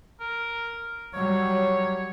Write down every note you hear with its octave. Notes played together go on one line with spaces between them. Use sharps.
A#4
F#3 G3 C#5